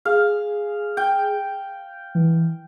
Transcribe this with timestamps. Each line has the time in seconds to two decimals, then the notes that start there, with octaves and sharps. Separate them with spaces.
0.05 G#4 F5
0.97 G5
2.15 E3